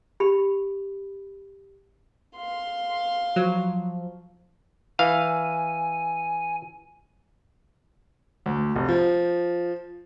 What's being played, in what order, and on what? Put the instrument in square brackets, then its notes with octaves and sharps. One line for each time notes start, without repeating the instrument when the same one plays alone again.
[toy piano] G4 B5
[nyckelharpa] F5 C6
[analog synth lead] F3 [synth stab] F#3
[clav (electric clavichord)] E3 F5 [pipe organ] G#5
[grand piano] D2
F1
F3